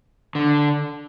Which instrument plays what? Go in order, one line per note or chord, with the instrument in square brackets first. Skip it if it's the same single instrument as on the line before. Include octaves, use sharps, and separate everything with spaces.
[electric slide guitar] D3